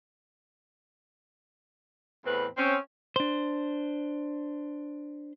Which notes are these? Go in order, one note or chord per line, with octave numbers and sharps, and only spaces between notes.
E2 A2 C4 B4
C4 C#4
D4 C5